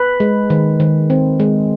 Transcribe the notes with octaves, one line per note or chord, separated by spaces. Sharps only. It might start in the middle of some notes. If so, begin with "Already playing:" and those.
Already playing: B4
G#3
D#3
D#3
C4
G#3